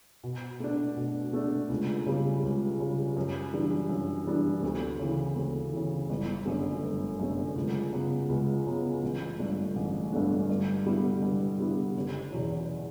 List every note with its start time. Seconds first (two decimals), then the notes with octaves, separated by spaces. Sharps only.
0.24 B2
0.60 A3 D4
0.97 B2
1.33 A3 D4
1.70 C#2
2.06 C#3 G3
2.43 C#2
2.80 C#3 G3
3.17 F#2
3.53 E3 G3 D4
3.90 F#2
4.26 E3 G3 D4
4.63 D2
4.99 C#3 E3
5.36 D2
5.73 C#3 E3
6.09 G1
6.46 F#2 D3 A3
6.83 G1
7.20 F#2 D3 A3
7.56 C#2
7.93 C#3 F#3 B3
8.29 C#2
8.66 C#3 F#3 B3
9.03 A1
9.39 G2 D3 A3 D4
9.76 A1
10.12 G2 D3 A3 D4
10.49 G2
10.86 D3 G3 B3 E4
11.22 G2
11.59 D3 G3 B3 E4
11.96 F#1
12.32 E2 B2 F#3